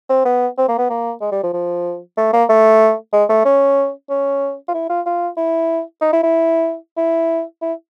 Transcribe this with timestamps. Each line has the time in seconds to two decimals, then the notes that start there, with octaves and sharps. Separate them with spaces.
0.09 C4
0.25 B3
0.58 C4
0.68 A#3
0.78 B3
0.90 A#3
1.21 G#3
1.32 G3
1.43 F3
1.53 F3
2.17 A3
2.33 A#3
2.49 A3
3.13 G#3
3.29 A3
3.45 C#4
4.10 C#4
4.68 F4
4.74 E4
4.90 F4
5.06 F4
5.37 E4
6.01 D#4
6.12 E4
6.23 E4
6.97 E4
7.62 E4